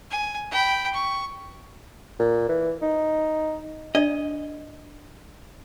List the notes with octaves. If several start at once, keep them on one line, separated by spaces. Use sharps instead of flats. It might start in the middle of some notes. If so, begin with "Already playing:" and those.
G#5
G5 B5
C#6
A#2
E3
D#4
D4 D5 D#5